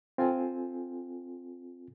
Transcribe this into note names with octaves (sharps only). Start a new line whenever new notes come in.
C4 F4 A4 G#5